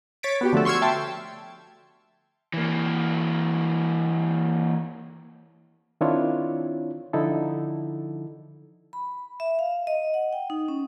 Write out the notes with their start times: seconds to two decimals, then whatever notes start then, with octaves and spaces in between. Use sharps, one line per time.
0.23 C#5 A6 B6 D7
0.41 B3 F#4 G4
0.53 D3 F3 A3 F#4 A4
0.65 C6 C#6 E6 F6 G#6
0.82 E5 G5 A5 C6
2.54 E3 A#3
6.01 D#3 C4 D4 E4 F4 C#5
7.13 D3 F3 D#4 E4 A4
8.93 B5
9.40 E5
9.59 F5
9.87 D#5
10.14 F#5
10.33 G5
10.50 D#4
10.68 C#4